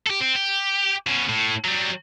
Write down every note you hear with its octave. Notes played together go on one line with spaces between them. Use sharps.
G4 A4
C4
G4
B2 C#4
A2
F#3 G3